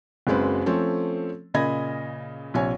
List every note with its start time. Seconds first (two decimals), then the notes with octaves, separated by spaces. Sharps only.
0.27 F#1 F#2 G#3 C4 B4
0.66 F3 A3 C4 C#4 A4
1.54 A#2 C#3 D#5 B5 G#6 A#6
2.54 A#1 C3 C#5 G#5